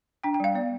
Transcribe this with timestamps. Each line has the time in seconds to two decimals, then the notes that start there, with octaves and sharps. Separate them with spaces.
0.24 D4 G5
0.34 G5
0.40 G3 F5
0.54 B3 D5